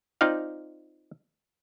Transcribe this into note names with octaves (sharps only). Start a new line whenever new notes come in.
C4 D#4 F4 D5 F5